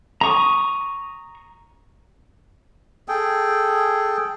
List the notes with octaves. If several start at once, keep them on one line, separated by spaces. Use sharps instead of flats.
A#5 C#6 D#6
G#4 A4 G5